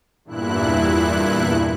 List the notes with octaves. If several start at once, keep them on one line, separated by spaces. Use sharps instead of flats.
E2 G2 A#2 E4 F#6